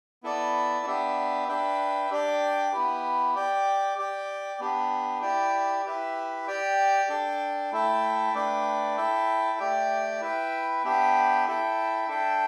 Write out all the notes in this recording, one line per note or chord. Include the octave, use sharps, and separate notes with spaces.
B3 E4 A4 D5
B3 D4 G4 E5
D4 B4 E5 G5
D4 G4 D5 G5
B3 E4 G4 B4
G4 D5 G5
G4 D5 G5
B3 D4 G4
E4 G4 D5 G5
E4 G4 B4 E5
G4 D5 G5
D4 A4 G5
A3 E4 A4 E5 G5
A3 D4 B4 D5 G5
E4 A4 E5 G5
A3 G4 D5 G5
E4 B4 E5 G5
B3 D4 G4 E5 G5
E4 A4 E5 G5
D4 A4 E5 G5